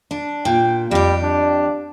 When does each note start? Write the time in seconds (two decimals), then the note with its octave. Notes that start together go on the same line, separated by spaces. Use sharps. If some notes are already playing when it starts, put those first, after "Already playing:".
0.11 D4
0.45 A#2 G5
0.91 F2 G3 G4
1.23 D4